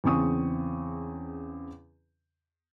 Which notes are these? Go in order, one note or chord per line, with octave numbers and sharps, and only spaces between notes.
E2 C#3 C4 C#6 D#6